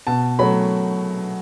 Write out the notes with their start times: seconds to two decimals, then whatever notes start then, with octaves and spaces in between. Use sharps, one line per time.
0.07 B2 A5
0.39 F#3 A3 B5